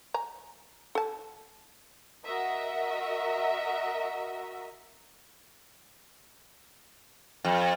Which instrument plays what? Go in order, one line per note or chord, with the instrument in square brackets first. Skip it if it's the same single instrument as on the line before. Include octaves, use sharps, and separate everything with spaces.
[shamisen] G#5 A#5
A4 A5
[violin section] F#4 A#4 D#5 E5
[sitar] F2